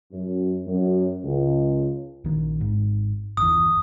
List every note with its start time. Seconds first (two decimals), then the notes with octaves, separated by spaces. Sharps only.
0.12 F#2
0.68 F#2
1.24 C#2
2.24 A#1 D#3
2.60 G#1 G#2
3.37 G1 E2 D#6